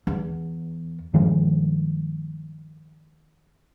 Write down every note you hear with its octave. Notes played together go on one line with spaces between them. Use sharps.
E2
G2 D#3 F3 G#3